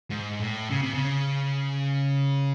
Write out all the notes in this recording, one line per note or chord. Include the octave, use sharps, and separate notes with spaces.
G#2
A2
C#3
C3
C#3